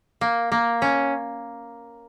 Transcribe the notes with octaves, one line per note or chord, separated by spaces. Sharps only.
A#3
A#3
C#4